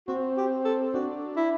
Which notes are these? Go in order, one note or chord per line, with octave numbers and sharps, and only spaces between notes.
C4 F#4
G4
A4
D4 F#4
E4